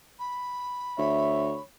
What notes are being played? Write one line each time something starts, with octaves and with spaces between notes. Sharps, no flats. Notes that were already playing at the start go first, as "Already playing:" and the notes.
B5
D2 C#5 E5